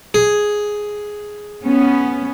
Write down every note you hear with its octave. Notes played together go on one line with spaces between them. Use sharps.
G#4
B3 C#4